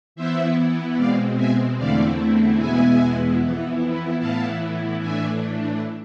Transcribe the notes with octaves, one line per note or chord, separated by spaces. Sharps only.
E3 B3 E4 C5 E5
B2 G#3 C4 D5 F5
E5 G#5
E2 D3 A3 C4 E4 D5 F5
E2 B2 G#3 B3 E4 E5 G#5
F2 E3 B3 E4
A2 E3 B3 E4 F5 A5
A2 E3 A3 D4 E5 G#5